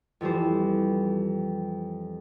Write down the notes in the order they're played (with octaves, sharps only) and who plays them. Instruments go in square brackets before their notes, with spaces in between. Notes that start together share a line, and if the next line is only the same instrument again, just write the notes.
[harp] F2 E3 G3 C5